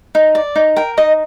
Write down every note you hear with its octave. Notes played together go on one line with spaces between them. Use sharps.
D#4
D5
D#4
A#4 G5
D#4 D#5